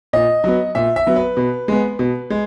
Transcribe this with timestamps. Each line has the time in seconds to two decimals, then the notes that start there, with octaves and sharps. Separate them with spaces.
0.13 A#2 D#5
0.44 F#3 B3
0.75 A#2 E5
0.96 E5
1.07 F#3 B3
1.16 B4
1.37 B2
1.68 G#3 B3
1.99 B2
2.30 G#3